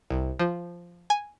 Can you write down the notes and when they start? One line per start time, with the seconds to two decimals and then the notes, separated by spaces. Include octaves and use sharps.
0.10 C2
0.39 F3
1.10 G#5